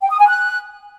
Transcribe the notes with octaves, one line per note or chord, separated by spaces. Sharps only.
G5
D#6
G#5
F#6